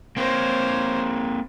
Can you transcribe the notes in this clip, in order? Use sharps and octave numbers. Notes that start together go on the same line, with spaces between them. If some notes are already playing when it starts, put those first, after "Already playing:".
A#3 C4 C5 C#5